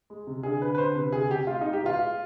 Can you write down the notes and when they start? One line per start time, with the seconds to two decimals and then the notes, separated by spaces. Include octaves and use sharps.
0.10 G#3
0.27 C3
0.43 D3 G#4
0.61 D3 B4
0.75 B4
0.78 D3 C5
0.95 C3 B4
1.12 C3 G#4
1.30 C3 G4
1.47 G#3 F4
1.61 G#3 D#4
1.73 G4
1.83 B2 F4
1.99 G#3